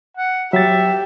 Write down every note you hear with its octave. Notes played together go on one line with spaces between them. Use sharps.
F#5
F#3 G4 E5 A6